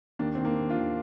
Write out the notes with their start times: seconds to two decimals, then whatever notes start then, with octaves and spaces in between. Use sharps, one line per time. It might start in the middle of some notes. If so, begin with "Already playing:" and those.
0.19 D#2 A#3 D4
0.35 D#3 C4
0.45 A#3 D4
0.57 D#2
0.70 D4 F4
0.77 D#2